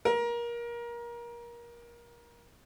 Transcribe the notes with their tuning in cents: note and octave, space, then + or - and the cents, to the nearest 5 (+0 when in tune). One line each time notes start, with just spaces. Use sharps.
A#4 +25